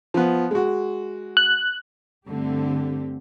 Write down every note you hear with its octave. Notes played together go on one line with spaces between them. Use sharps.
F3 B3
G#3 F#4
F#6
G2 D3 A3 C4 G4